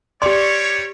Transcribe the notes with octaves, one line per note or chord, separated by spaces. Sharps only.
G3 G4 C#5 D5 C6